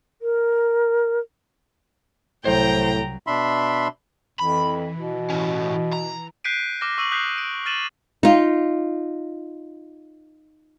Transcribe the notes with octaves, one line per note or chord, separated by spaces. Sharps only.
A#4
C2 A2 F#3 C5 G5 A#5
B2 D4 E5 B5 C6
F2 E3 B5
B2
A2 C#4
A#5
F#6 G6 B6 C7 D7 D#7
D6 F6 A#6
C#6 E6 D#7 F#7
D#6 F#6 G6 B6 C7
D7
F6 A6 D#7 E7 F#7
D#4 F4